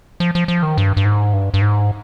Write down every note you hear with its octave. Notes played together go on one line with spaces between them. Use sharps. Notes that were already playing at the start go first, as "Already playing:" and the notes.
F3
F3
F3
D#3
G2
G2
G#2
G2
G2
G#2